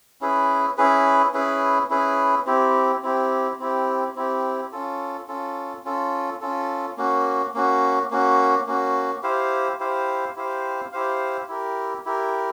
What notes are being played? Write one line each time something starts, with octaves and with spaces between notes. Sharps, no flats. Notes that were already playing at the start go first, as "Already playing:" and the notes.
C#4 E4 G#4 B4
C#4 E4 G#4 B4
C#4 E4 G#4 B4
C#4 E4 G#4 B4
C4 E4 G4
C4 E4 G4
C4 E4 G4
C4 E4 G4
C#4 F4 A4
C#4 F4 A4
C#4 F4 A4
C#4 F4 A4
A#3 C#4 F#4
A#3 C#4 F#4
A#3 C#4 F#4
A#3 C#4 F#4
E4 G4 C5 F5
E4 G4 C5 F5
E4 G4 C5 F5
E4 G4 C5 F5
E4 G4 A#4
E4 G4 A#4